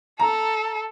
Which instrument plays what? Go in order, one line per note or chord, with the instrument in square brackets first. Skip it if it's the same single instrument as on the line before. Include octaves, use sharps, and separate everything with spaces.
[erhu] A4 [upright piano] A#5